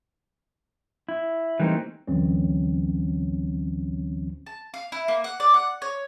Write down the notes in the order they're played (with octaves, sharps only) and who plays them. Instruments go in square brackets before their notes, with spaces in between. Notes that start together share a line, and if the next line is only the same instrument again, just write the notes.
[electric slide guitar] E4
E3 G3 A3 A#3 C4 D#4
[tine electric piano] D2 D3 E3 F#3 C4 C#4
[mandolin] A5
F5
E4
A#3
F#5
D5
F#5
C#5